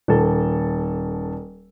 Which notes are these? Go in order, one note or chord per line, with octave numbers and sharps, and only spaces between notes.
D#1 A4